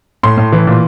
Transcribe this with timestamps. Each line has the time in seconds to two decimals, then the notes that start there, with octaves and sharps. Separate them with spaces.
0.23 A2 C6
0.38 A2
0.52 E3
0.67 A#2